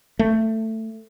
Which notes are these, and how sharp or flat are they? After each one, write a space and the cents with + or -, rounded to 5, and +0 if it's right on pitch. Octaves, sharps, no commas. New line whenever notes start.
A3 +15